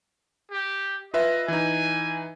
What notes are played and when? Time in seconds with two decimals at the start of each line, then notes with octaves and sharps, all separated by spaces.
0.51 G4
1.14 F4 B4 D#5 E5
1.48 E3 D#4 G#5